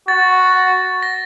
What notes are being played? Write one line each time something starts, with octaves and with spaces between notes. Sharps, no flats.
F#4 A6
A#6